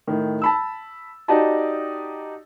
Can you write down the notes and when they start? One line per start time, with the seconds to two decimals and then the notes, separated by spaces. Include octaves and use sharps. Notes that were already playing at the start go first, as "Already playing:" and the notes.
0.07 A2 D#3
0.42 A5 B5 E6
1.28 D#4 F#4 G4 D5 D#5 A5